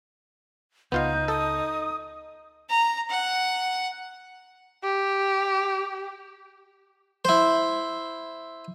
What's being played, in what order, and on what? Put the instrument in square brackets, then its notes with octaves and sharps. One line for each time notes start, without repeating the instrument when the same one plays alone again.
[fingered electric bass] C#2 [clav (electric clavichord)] B3 F4 F5 [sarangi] D#4 [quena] G6
[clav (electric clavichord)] A4 [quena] D#6
[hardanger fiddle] A#5
F#5
[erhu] G4
[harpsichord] E4 C5